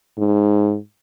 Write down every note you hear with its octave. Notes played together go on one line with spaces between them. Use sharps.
G#2